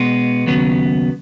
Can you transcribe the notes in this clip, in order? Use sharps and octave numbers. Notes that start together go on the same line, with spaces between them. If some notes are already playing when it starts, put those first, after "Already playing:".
Already playing: B2 G#3 B3
D#2 C#3 F#3 B3